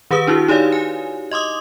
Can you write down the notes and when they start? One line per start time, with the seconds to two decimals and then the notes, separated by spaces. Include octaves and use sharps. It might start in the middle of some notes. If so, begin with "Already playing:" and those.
0.11 D#3 G4 G#4 B4 D#6
0.27 D4 E4 F#4
0.48 D#4 G4 C#5 D5 F5
0.72 G#5
1.31 D#5 C6 D6 D#6